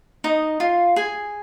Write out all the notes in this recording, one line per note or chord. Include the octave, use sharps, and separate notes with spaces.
D#4 D#5
F4 F5
G#4 G#5